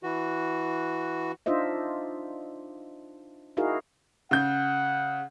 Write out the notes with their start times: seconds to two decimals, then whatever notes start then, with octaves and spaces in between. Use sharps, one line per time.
0.03 E3 F#4
1.46 D4 D#4 F4 C5 D#5 E5
3.57 D#4 E4 F#4 G#4 A#4 F5
4.31 C#3 F#5 G6